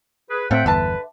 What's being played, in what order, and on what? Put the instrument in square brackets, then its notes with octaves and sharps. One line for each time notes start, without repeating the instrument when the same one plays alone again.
[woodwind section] G#4 B4
[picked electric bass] A2 C4 [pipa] F4 A4 [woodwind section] E5 F#5 G5
[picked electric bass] G1 E2 [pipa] D3 E5 A5 [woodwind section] B4